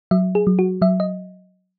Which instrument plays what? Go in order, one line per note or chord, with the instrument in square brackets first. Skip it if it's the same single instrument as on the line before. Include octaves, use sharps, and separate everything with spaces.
[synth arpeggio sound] F#3 E5
G#4
F#3
F#4
F#3 E5
D#5